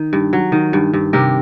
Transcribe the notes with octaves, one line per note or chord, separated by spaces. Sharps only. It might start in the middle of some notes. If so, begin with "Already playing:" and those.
Already playing: D#3
G2
F#3
D#3
G2
G2
C3 G4 A#4